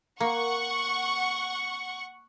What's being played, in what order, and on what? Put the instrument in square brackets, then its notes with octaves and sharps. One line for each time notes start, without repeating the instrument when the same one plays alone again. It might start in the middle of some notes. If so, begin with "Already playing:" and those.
[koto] A#3 [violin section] F#5 C#6